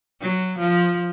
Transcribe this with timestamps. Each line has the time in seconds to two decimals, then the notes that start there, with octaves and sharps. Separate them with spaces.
0.22 F#3
0.60 F3